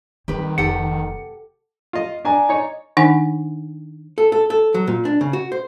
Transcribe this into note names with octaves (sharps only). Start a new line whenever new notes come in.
D#3 G3 C4 G4 B4
F1 G4 A4 F#5 C#7
F4 D#5
D4 D5 G#5 A#5
D#4 C#5
D#3 D4 D#4 F#5 G#5
A4
A4
A4
F#3
A#2
D4
C#3
F#4
C5